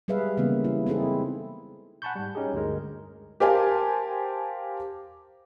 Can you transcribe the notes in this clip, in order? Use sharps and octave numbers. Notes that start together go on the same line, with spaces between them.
G3 G#3 G#4 B4 E5 F5
C#3 E3 G3 A#3 B3
E4
C4 D#4 E4 G#4 A4
F#5 G#5 A5 B5 C#6 G6
G#2 G3
C#4 D#4 G4 G#4
D2 G2 G#3 A#4
G4 A#4 C5 F5 G#5 A5